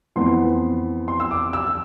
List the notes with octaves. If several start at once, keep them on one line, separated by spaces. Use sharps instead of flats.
F2 E3 B3 C6
C6
E6
D6
E6